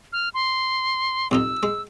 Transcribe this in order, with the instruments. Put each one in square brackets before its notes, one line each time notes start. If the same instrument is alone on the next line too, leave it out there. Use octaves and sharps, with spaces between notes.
[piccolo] F6
C6
[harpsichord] C2 F2 D#4 [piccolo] E6
[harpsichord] G#3